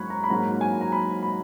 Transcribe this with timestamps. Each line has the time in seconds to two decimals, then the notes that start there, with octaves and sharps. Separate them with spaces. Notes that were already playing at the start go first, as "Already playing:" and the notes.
Already playing: G#2 F#3 A#3 B5 C#6 F#6 G#6
0.10 A#5
0.24 B5
0.30 G#2 F#3 A#3 A#5
0.61 G#5
0.81 A#5
0.92 B5
1.23 B5